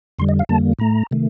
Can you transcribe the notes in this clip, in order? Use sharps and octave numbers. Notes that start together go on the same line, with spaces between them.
F2 D3 G3 C6
D#5
F5
F2 D3 G3 A#3 A5
A2 A3 A#5
C3 D#3 A3